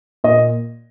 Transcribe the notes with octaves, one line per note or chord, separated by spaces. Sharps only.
A#2 D#5